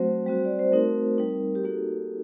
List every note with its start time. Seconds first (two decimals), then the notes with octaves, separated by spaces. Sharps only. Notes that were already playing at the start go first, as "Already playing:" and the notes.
Already playing: F#3 A3 C4 F#4 C5
0.26 G3 C4 F#4
0.45 D5
0.59 C5
0.72 A3 C4 D#4 F#4 A#4
1.18 G3 C4 D#4
1.55 G4
1.64 A#3 D#4 F#4 A4